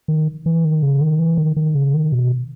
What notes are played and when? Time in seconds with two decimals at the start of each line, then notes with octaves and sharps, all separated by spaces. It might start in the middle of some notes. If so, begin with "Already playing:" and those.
0.08 D#3
0.46 E3
0.65 D#3
0.83 C#3
1.01 D#3
1.19 E3
1.37 D#3
1.56 D#3
1.75 C#3
1.94 D#3
2.12 B2